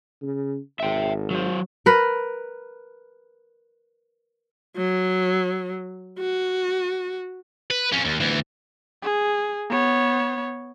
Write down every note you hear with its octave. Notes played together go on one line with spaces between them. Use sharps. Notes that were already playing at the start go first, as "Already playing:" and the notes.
C#3
G#1 E5 G5
F#3 C5
A#4 B4
F#3
F#4
B4
F2 C#4
D#2
D2 E3
G#4
B3 C#5